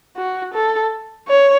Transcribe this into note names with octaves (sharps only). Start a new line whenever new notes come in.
F#4
A4
C#5